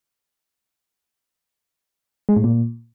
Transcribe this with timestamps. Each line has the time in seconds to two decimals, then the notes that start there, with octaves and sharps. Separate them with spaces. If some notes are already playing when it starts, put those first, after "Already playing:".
2.29 G#3
2.36 A2
2.44 A#2